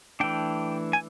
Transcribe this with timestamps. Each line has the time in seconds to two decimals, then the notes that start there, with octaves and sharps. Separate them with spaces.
0.20 E3 A3 D4 G5
0.93 G#5